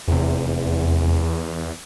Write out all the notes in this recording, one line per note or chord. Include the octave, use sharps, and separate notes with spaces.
F1 E2 C3